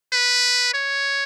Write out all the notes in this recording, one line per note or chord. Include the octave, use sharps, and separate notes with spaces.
B4
C#5